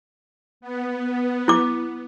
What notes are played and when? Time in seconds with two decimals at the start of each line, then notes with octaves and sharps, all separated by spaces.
0.61 B3
1.48 E4 D6